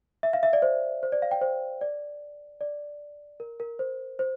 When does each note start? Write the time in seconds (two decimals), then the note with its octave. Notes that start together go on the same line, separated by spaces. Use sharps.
0.23 E5
0.33 F5
0.43 E5
0.53 D5
0.62 C5
1.03 C5
1.12 D5
1.22 F5
1.31 G5
1.41 C5
1.81 D5
2.61 D5
3.40 A#4
3.60 A#4
3.79 C5
4.19 C5